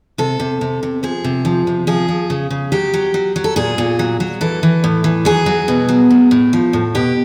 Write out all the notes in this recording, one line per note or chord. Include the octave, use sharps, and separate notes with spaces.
C3 A4
C3
C3
C3
F3 G#4
C3
F3
C3
F3 G#4
F3
C#3
C#3
F#3 G4
F#3
F#3
F#3
A4
A#2 G#4
A#2
F#3
F#3
E3 A4
E3
A2
E3
F#3 G#4
F#3
B2
F#3
A2
A2
F3
A2
B2 G4